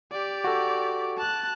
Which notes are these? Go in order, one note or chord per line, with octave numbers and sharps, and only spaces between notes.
G4 D5
F#4 A4
A5 F#6